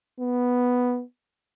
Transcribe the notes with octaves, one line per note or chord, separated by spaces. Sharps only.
B3